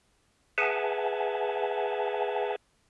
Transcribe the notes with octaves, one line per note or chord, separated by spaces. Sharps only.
G#4 B4 E5 F#5 G#5 A5